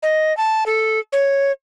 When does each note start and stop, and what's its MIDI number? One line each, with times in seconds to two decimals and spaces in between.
0.03 0.35 75
0.37 0.64 81
0.66 0.99 69
1.12 1.52 73